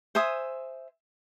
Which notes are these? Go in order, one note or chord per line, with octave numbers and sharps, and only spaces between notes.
C5 E5 G#5 D#6